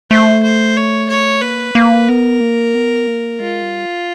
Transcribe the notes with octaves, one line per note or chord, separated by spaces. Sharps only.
A3 C5
C5
C#5
C#5
A#3 B4
A#3
B3 A#4
A#3
B3
A#3
G#3 F4
G3